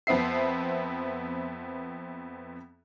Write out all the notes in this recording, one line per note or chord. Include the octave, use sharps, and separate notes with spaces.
F2 B3 C4 E5 C7